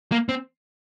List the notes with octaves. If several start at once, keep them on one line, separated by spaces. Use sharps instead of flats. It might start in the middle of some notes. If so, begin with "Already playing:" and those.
A#3
C4